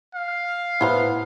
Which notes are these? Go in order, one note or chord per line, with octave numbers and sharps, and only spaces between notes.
F5
A2 B3 E4 C5 A#5